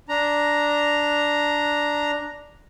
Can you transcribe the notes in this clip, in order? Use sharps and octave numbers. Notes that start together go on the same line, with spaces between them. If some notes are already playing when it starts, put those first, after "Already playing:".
D4 A#5